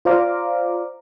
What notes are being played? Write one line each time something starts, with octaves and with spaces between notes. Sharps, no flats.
F4 C5 D5 F5 A#5 D6